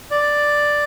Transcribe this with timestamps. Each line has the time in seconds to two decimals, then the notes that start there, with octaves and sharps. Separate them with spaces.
0.11 D5